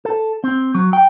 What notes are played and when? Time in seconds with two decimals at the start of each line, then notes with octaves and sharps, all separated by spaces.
0.05 A4
0.44 C4
0.75 F#3
0.93 G5